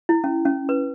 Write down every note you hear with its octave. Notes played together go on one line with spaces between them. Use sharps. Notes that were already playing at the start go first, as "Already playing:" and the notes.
E4
C#4
C#4
B4